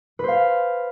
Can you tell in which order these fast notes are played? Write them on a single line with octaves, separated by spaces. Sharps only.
B4 C5 F5